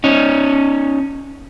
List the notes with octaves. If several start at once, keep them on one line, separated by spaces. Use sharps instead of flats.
C#4 D#4